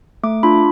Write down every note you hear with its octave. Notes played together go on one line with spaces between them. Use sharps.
A3 D6
D4 F4 B5